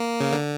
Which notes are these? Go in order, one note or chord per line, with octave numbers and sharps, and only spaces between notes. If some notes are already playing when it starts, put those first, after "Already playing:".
Already playing: A#3
C#3
D3